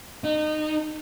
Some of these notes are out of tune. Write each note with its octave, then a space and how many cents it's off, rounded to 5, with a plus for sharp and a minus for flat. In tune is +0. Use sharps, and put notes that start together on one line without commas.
D#4 -25